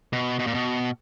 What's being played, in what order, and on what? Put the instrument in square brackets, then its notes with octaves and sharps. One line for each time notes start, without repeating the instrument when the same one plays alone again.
[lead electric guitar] B2
B2
A#2
B2